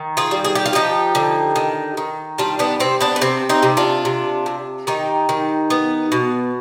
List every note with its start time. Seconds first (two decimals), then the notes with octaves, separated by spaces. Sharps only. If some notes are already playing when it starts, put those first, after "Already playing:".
Already playing: D#3
0.17 F4 G#4
0.31 G3
0.45 G#4
0.55 G4
0.66 F4
0.73 F3 D#4 G4
1.15 D3
1.56 D#3
1.97 D#3
2.38 G3 D4 F4
2.59 B3 D4
2.80 C3 C4
3.01 B3 D4
3.16 B3
3.21 C3 C4
3.49 C4 D#4
3.63 C3
3.77 D4 F4
4.05 C3
4.46 C3
4.87 D#3 D#4 G4
5.29 D#3
5.70 B3
6.12 B2